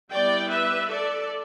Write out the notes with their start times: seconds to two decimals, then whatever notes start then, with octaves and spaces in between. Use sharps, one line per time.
0.12 G3 B3 E4 D5 G5
0.51 B4 E5
0.90 A4 D5